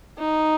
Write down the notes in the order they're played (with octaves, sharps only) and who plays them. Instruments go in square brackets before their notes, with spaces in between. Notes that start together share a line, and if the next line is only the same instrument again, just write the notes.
[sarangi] D#4